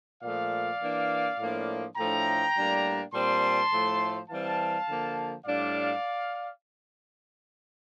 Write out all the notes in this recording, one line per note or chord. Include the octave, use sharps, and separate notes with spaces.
A#2 F3 A3 D5 F5
E3 A#3 D4
A2 F3 A#3 D4
A2 F3 A3 D4 G5 A#5
A2 G3 A#3 D4
A#2 G3 C4 A5 C6
A2 F3 A3
E3 G3 C4 F5 A5
D3 F3 A#3
A2 G3 D4 D5 F5